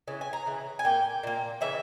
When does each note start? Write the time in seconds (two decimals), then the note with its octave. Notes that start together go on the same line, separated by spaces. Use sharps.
0.08 C#3 E3
0.21 G#5
0.33 A#5
0.46 C#3 E3
0.79 G#5
0.85 A#2 A#3 G5
1.23 A#2 A#3
1.61 C#3 E3 E5